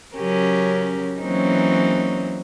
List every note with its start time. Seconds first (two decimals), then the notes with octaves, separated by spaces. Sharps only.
0.16 C#3 F#3 C#4 G4 A#4
1.20 E3 F#3 A#3 C4 C#4 D#4